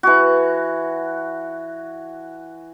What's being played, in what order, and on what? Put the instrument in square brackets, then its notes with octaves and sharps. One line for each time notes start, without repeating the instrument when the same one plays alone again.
[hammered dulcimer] E3 F#4